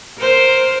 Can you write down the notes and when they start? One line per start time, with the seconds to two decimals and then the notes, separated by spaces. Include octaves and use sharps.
0.18 A#4 C5